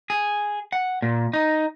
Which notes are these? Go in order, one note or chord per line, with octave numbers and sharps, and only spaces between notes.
G#4
F#5
A#2
D#4